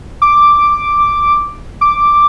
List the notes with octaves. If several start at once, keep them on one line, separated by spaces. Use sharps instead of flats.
D6
D6